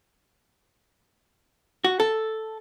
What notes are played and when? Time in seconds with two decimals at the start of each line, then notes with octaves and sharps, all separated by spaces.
1.84 F#4
2.00 A4